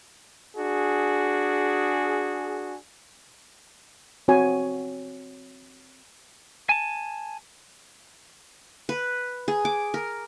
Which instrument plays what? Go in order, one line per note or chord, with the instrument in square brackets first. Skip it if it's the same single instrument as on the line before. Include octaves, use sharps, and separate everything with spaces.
[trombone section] D4 F#4 G#4
[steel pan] C4 F#4 C#5 G#5
[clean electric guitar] G#5 A5
[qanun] B4
G#4
D6
A#4